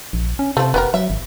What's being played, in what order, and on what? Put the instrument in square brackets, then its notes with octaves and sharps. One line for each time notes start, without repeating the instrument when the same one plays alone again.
[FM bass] A#1
C#4
[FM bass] C3 [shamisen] F3 A3
[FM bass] F1 [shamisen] B3 G4 A#4
[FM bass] F#3 [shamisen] E5
[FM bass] G#1